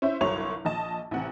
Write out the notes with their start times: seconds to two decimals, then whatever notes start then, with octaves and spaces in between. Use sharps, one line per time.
0.02 C#4 E4 C5 E5
0.21 G1 C2 F#3 C#5 C6 F7
0.65 A#1 D#5 A5
1.11 A1 C3 F#5